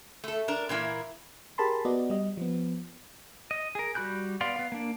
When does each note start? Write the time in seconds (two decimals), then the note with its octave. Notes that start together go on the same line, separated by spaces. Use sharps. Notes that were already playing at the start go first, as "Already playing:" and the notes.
0.24 A3 A4
0.48 D4 A#4
0.69 A#2 E3 A#3 E4
1.58 G4 G#4 A#4 A5 B5 C6
1.85 B3 F#4 D5 D#5
2.10 G3 D#5
2.37 F3 B3
3.51 D#5
3.75 G#4 A#4
3.95 G3 F#4 B5 F#6 G6
4.41 B3 D5 F5 C6
4.56 B3 F5
4.72 A#3 D4